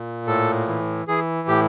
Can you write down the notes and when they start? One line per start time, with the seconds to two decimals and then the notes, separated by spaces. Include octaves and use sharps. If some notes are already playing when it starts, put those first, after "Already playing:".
Already playing: A#2
0.27 A2 A4
0.68 E3
1.08 E3 G#4
1.48 A2 G4